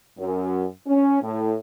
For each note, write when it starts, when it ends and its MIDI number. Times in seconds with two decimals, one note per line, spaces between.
0.18 0.65 42
0.87 1.18 61
1.22 1.54 45